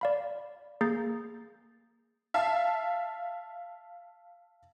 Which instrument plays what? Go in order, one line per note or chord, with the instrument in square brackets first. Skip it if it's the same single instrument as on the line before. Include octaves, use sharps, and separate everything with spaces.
[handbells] D5 F5 B5
A#3 G#4 A#5 G6 A6 C7
[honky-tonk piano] E5 F5 A5